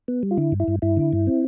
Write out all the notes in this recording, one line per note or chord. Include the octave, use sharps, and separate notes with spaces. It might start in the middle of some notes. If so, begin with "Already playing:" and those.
B3
G3
F4
D3 E4
G2
E4
G2
G2 E4
D3
G2
C4